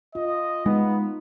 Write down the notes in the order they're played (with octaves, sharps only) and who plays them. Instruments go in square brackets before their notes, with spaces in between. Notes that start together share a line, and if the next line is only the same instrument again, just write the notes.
[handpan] F4 [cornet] D#5
[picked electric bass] G#3 [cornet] B3 [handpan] D#4